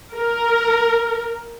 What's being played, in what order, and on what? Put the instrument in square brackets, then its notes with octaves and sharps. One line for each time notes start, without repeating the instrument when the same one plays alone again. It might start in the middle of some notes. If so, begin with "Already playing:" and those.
[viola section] A#4